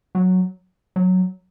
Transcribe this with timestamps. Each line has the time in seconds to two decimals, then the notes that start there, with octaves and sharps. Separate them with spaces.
0.15 F#3
0.96 F#3